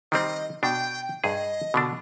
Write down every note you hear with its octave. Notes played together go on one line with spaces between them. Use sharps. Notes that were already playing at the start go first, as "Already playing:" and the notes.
D#3 G3 C4 D#5
B2 D4 G5
G2 G#4 D#5
B2 D3 D4